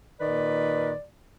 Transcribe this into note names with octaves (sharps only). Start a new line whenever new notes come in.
A#2 D#3 B4 D5